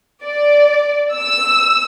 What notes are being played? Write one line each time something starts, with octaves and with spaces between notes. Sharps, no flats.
D5
E6